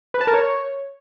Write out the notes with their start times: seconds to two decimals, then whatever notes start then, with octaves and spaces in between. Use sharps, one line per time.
0.14 B4
0.21 A5
0.27 A#4
0.34 C#5